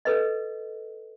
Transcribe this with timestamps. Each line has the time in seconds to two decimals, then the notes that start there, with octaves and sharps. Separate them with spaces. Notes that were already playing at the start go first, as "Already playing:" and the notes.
0.05 A4 B4 D#5